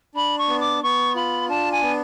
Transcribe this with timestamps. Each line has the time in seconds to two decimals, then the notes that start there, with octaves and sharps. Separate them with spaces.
0.15 D4 B5
0.38 C#6
0.48 B3
0.60 D6
0.83 B3 C#6
1.15 F4 B5
1.49 D4 A5
1.71 G#5
1.82 B3